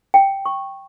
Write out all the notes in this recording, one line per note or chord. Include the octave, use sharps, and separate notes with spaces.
G5
C#6